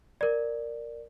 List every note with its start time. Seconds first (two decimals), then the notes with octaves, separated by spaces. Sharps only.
0.21 A#4 D5